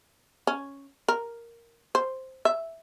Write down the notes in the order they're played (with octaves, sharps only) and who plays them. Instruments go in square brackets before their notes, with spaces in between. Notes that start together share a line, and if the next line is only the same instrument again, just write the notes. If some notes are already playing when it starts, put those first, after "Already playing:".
[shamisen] C#4
A#4
C5
E5